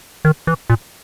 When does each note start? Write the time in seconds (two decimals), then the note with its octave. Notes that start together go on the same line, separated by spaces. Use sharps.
0.25 D#3
0.47 E3
0.70 A#2